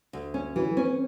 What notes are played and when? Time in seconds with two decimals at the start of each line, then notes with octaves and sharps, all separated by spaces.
0.13 D2
0.34 C#4
0.56 E3 F#3
0.77 C4 C#4